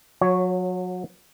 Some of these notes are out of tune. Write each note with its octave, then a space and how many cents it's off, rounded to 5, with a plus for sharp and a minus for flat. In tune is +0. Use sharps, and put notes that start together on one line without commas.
F#3 -30 C#5 +0